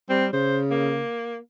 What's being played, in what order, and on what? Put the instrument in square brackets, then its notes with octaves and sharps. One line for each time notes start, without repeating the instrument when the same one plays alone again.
[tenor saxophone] G3 [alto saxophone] C4
[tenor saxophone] C#3 [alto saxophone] C5
[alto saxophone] A#3